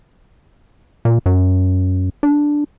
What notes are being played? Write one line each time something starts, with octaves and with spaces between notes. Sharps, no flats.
A#2
F#2
D4